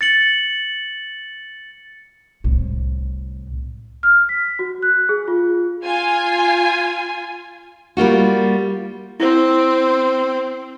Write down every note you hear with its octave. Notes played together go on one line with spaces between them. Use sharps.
A6 C#7 F#7
C2 A2
F6
B6
F#4
F#6
G#4
F4
F4 G#5
G3 A#3 F4 F#4
C4 E4 C5